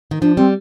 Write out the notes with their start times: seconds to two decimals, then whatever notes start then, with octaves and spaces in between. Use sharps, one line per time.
0.11 D#3
0.21 F3 D4
0.37 G3 C4